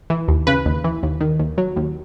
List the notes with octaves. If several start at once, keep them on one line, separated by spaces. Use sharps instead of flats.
E3
D#2
C#3 B4
D#2
E3
D#2
D#3
D#2
F#3
D#2